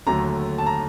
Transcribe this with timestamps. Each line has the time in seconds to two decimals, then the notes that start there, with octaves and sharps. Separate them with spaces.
0.07 D#2 D3 F#3 A3 A#5
0.58 A5
0.66 A#5